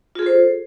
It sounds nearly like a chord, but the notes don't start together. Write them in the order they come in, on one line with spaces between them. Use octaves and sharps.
F4 G#4 A4 C5